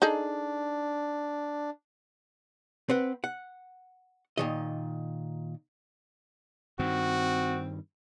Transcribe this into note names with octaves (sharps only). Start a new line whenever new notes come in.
D4 D#4 G#4 A4
C4 B4 F#5
F#5
A#2 D#3 D#5
G2 D#3 C4 F#4